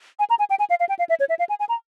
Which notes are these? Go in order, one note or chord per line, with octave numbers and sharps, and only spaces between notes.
G#5
A#5
G#5
G5
G#5
F5
F5
G5
F5
E5
C#5
E5
F5
G#5
G#5
A#5